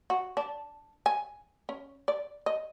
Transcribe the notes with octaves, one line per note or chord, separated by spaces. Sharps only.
F#4
D4
G#5
C#4
D5
D#5